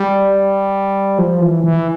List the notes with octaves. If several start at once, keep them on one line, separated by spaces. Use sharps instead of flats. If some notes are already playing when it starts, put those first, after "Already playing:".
Already playing: G3
F3
E3
E3